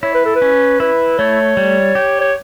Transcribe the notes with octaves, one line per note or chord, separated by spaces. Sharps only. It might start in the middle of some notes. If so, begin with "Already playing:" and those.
E4 C#5
B4
A4
B4
C#4
E4 B4
A3 C#5
G3
G4
C#5